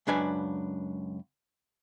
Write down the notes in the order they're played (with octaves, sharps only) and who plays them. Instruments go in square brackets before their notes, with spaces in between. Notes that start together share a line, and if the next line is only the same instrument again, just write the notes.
[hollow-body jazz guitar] C#2 F#2 D4 B4 G#5